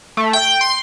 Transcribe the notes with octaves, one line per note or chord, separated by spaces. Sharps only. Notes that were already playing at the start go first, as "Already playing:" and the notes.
A3
G5
C6